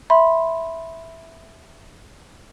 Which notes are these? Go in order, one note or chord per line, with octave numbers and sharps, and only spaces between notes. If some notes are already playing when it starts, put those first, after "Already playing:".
E5 B5 C6